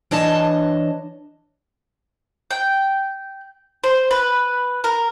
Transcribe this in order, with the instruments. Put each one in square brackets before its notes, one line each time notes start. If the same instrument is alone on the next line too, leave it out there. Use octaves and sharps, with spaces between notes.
[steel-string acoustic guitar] E3 D4 C#5 D#5 A5
[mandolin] G5
C5
B4
A#4